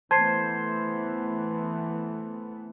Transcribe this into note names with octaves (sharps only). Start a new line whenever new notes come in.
E3 A3 B3 C5 A5 G#6 C7